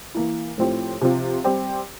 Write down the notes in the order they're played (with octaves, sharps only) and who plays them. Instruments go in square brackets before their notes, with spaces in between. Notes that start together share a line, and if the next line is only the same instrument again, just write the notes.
[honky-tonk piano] E3 A#3 E4
A2 F3 C4 E4 G4
C3 F3 C4 F4
G3 C4 G4